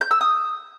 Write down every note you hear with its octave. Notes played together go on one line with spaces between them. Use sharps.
G6
E6
D#6